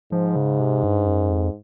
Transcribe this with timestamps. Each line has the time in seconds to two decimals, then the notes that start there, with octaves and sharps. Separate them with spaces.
0.12 G#2 F3
0.36 C#3
0.60 C3
0.83 G2
1.06 F#2
1.30 F2